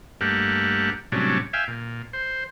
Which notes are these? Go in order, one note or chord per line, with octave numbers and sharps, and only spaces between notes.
G2 A3 A#3 G4 F#5
A2 C3 F#3 G3 C#4 D4
E5 F5 G5 G#5
A#2
C5